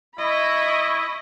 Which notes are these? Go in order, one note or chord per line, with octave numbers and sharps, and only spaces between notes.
E4 D#5 B5 C#6